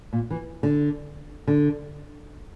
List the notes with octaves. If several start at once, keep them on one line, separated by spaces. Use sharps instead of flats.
A#2
E3
D3
D3